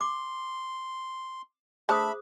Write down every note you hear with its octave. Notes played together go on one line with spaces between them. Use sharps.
C6 D6
A3 D4 G#4 C5 E5 A5 B5 D#6